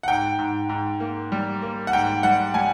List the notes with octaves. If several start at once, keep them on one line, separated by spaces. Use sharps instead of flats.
F#5
G#2 G5
G#2
G#2
A#3
G3
A#3
F#5
G#2 G5
G3 F#5
G3 G#5